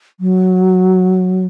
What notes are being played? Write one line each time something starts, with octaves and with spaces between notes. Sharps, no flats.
F#3